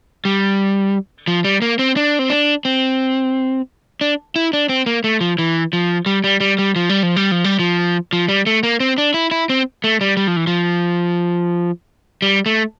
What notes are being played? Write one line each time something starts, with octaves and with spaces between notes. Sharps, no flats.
G3
F3
G3
A#3
C4
D4
C4
D4
C4
D4
E4
D4
C4
A#3
A3
F3
E3
F3
G3
G3
G3
G3
F3
G3
F3
G3
F3
G3
F3
F3
G3
A3
A#3
C4
D4
E4
E4
C4
A3
G3
G3
F3
E3
F3
G3
A3